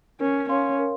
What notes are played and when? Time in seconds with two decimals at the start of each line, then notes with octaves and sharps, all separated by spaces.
0.20 C#4 A#4
0.49 C#4 C#5 F5 C6
0.79 A#4